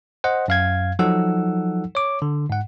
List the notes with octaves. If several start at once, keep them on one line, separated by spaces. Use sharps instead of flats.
C5 D#5 F#5
F#2 F5 G#6
F3 F#3 D#4 A4 F#5 E6
C#5 D6
D3
G#2 F#5